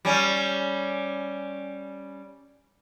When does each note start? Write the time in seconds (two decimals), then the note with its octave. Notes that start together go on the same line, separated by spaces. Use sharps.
0.05 G3 C#4